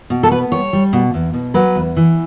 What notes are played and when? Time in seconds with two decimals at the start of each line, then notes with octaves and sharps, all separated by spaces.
0.10 B2
0.23 A4
0.31 B3 B4
0.52 G3 C#5
0.73 G3
0.93 B2
1.14 E2
1.34 B2
1.54 F#3 B4
1.76 E2
1.97 E3